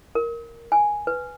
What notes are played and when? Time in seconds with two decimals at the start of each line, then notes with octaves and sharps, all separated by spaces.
0.15 A#4
0.72 G#5
1.07 B4